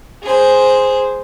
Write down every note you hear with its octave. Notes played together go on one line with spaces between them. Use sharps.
G#4 C5